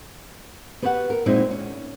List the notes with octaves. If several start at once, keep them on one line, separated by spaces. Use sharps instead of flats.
B3 F#4 G4 B4 E5 F#5
A#4
A#2 G#3 C4 D#4 E4
C#4